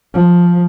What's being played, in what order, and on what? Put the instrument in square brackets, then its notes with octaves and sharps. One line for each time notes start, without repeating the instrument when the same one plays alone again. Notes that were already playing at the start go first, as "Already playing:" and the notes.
[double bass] F3